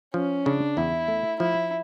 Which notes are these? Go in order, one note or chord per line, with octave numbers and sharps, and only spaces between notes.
F3 C#4
C#3 D4
E2 E4
A3
F3 E4